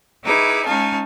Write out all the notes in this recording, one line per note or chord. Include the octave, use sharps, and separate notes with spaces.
D#4 E4 G#4 B4 D6
G#3 C#4 D#4 F5 G#5 A5